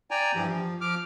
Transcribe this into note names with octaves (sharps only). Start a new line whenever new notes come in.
D5 G5 G#5 A#5
G2 E3 F3 G4
F3
F3 D6 F6